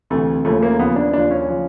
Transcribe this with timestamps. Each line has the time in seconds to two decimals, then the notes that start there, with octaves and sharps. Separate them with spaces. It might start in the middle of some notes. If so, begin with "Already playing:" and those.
0.10 D2 C3 E3 A3
0.45 D#2 C#3 F3 A3
0.63 A#3
0.79 D#2 C#3 F3 B3
0.96 D4
1.13 D#2 C#3 F3 D4
1.31 C#4
1.48 C#3 F3